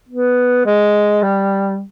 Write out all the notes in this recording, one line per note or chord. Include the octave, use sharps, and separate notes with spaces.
B3
G#3
G3